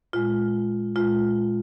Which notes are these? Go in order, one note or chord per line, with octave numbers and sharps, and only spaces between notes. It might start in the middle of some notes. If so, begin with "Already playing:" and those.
A#2 G#3 F4
A#2 G#3 F4